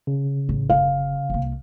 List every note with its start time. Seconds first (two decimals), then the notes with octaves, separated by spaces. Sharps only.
0.07 C#3
0.49 A1
0.70 F#1 F5
1.30 C2 A#3